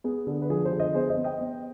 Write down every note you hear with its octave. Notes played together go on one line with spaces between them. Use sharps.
B3 G#4
D3
B4
F3 G#4
G#4 C5
D3
C5 D#5
B3 G#4 C5
C5 D#5
B3
D#5 G5
B3